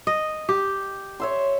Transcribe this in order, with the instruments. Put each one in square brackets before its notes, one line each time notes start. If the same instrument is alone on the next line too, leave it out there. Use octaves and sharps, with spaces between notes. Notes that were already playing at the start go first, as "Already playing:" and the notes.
[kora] D#5
G4
[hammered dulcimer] C#5 E5 C6